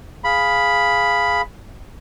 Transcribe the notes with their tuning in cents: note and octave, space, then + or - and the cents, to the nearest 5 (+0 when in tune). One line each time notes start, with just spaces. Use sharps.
G#4 +0 F5 +0 B5 +0